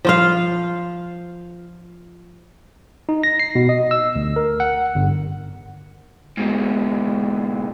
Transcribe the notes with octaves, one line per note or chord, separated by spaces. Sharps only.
F3 F4 F5
D#4
A#6
C7
B2
D#5
E6
D2
A#4
F#5
G1
G#2 B2